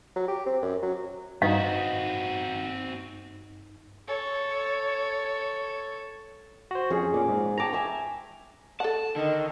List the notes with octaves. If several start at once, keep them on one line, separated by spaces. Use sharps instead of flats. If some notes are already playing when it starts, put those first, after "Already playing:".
F#3
G4
C4
F#2
F#3
G2 C4 D#4 F#4 F5
A4 C#5
F#4 C5
F2 C#4 G#4
A#2 C#4 D6
G#2
C#5 G5 A5 A#5 D6
E5 G#5 E6
A4 F#5 A5
D3 D#3